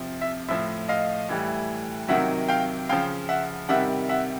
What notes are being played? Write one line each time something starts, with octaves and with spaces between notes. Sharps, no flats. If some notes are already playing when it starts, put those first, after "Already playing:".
Already playing: C3 F3
E5
A2 F3 E5
D#5 F5
A2 E3 G3
C3 D#3 F#3 E5 F#5
F5 G5
C#3 F3 F5 G5
E5 F#5
C3 D#3 G3 E5 F#5
E5 F#5